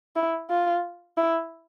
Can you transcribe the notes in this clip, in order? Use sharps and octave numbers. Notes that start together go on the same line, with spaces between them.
E4
F4
E4